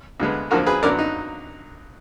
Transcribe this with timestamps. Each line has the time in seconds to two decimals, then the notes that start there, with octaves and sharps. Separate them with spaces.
0.20 D2 D3 G#3 B3
0.51 D2 D3 F3 A#3 F#4 A#4
0.67 G#4 B4
0.82 F#2 D3 F#3 B3 A#4 D5
0.99 D#4